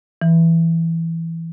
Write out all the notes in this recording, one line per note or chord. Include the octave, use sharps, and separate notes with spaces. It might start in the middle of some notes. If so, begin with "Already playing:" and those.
E3